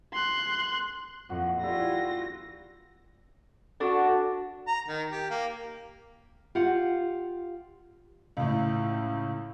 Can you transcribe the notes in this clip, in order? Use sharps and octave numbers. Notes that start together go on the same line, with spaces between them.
C6 F#6
F2 A#2 F#4
G3 E4 F4 A#6
D4 F#4 A4
A#5
D#3
G4
A#3
F4 G4 F5 F#5
C#2 A2